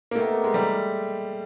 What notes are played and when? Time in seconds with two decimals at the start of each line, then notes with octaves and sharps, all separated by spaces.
0.11 A#3
0.15 A3 B3 D#4 G4 A#4
0.44 G#3
0.54 G3